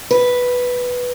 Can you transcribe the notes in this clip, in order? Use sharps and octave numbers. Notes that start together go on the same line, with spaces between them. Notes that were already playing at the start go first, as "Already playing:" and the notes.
B4